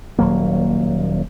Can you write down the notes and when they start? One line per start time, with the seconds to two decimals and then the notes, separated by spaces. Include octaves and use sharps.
0.19 D#1 F#3 A#3